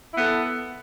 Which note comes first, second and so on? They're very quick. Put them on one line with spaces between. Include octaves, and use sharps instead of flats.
E4 B3 A4